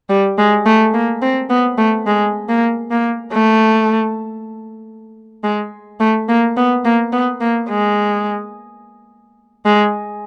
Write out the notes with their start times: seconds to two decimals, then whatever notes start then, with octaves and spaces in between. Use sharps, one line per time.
0.09 G3
0.38 G#3
0.66 A3
0.94 A#3
1.22 C4
1.50 B3
1.78 A3
2.07 G#3
2.49 A#3
2.91 A#3
3.33 A3
5.44 G#3
6.00 A3
6.29 A#3
6.57 B3
6.85 A#3
7.13 B3
7.41 A#3
7.69 G#3
9.66 G#3